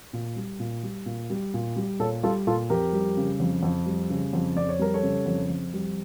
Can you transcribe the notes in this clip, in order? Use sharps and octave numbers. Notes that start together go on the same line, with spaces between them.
A#2
G3
A#2
G3
A#2
G3
A#2
G3
A#2 A4 C#5
G3 F4 A4
A#2 F4 A4
F2 G4 A#4
G3
C#3
F2
F2
G3
C#3
F2
F2 D5
C#5
G3 A#4
A4 C#5
C#3
F2
F2
G3